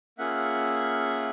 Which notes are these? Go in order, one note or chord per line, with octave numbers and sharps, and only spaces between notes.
A#3 C#4 F4 G#4 E5 F#5